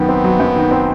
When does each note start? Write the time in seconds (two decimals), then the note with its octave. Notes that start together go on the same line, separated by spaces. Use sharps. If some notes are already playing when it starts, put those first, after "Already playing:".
Already playing: F#2 D#3 B3
0.09 C4
0.24 F#3
0.39 F#2
0.56 D#3
0.71 C4